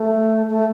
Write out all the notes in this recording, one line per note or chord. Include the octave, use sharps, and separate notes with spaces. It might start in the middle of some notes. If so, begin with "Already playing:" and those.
Already playing: A3
A3